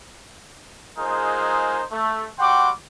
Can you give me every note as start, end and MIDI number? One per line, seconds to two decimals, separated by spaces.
0.98 1.82 56
0.98 1.82 63
0.98 1.82 65
0.98 1.82 68
0.98 1.82 70
0.98 1.82 72
1.91 2.26 57
2.39 2.69 55
2.39 2.69 66
2.39 2.69 78
2.39 2.69 79
2.39 2.69 84
2.39 2.69 86